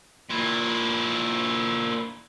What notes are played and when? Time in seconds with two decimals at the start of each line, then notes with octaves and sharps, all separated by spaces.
0.30 A#2 E4